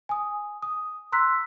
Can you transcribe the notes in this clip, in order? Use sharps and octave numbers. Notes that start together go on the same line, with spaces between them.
G#5 D#6
D#6
A#5 C6 E6 F#6 B6